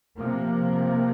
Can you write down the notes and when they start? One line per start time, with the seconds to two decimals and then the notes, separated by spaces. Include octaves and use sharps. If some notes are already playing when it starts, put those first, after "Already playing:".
0.17 C3 F3 A#3